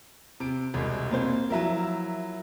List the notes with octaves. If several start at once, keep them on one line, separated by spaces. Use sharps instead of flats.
C3 D7
E1 C2 G#3
A#3 C4 C5
F3 F#3 E4 A#4 E5